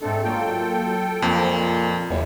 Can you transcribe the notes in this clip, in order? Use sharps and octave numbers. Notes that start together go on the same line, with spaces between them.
G#2 A3 C4 D4 A4
F#3 A#3 F4 A4 G5
F2 A#2 F3
F#1 E2